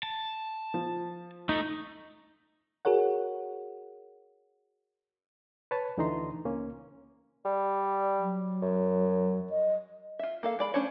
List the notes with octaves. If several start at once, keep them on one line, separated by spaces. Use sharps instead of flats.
A5
F3
A3 D#4
F#4 G#4 A#4 C#5 F#5
B4 C#5 A5
D2 D3 E3 D#4 A#5 C6
C#2 A#3 C#4
G3 D5
F#3
F#2
D#5
F4 E5
A#3 A4 F5
G#3 D5 B5
A3 C#4 D4 C5 C#5